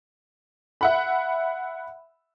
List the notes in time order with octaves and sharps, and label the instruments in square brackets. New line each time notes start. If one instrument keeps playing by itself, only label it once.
[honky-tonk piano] E5 F#5 B5